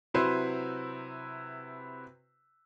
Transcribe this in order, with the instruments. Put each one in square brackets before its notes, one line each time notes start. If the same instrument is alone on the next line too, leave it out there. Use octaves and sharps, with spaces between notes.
[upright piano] C3 F#3 E4 B4 C5